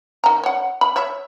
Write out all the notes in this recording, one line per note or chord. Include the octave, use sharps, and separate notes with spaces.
D#3 A#5
C#5 F#5
B5
C#5 E5